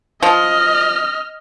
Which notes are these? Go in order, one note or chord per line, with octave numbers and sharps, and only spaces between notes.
F3 D#5 F6